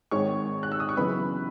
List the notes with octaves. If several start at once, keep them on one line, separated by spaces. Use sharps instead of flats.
G#1 G#2 D#3 G#3 C#5 C#6
F#6
E6
D#6
C#6
F#2 C#3 E3 B3 B4 B5